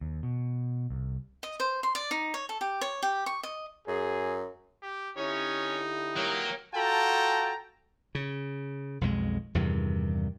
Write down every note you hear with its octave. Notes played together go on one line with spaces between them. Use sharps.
D#2
B2
C2
D#5
C5
C6
D5
D#4
C#5
A4
G4
C#5
G4
C#6
D#5
F#2 G#4
G4
D3 C#4 D#4 E4 G4 C#5
F#3 A#3 G5
F4 F#4 A4 G5 A5 A#5
C#3
B1 F2 D#3 G#3
E2 G2 C3 D#3